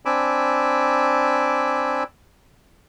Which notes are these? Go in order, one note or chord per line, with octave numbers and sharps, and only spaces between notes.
C4 D4 G#5 B5 D6 E6